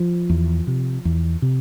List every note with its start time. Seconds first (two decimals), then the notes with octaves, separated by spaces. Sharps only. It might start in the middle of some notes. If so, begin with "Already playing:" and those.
Already playing: F3
0.30 E2
0.67 C3
1.05 E2
1.42 C3